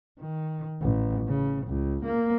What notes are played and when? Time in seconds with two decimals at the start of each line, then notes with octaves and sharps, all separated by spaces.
0.20 D#3
0.81 A1
1.27 C#3
1.66 C#2
2.05 A#3